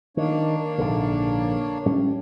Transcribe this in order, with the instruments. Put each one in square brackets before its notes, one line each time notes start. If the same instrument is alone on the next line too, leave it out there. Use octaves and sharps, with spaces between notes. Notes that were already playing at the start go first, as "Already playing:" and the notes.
[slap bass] D#3 [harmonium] A#3 D4 C#5
[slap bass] A#1 G#2 D3
A2 G3 C#4